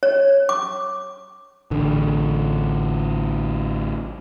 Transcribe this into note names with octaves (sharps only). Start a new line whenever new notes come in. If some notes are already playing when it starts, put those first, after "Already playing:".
C#5
D6
A1 D3